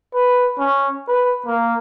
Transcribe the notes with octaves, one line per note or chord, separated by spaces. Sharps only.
B4
C#4
B4
A#3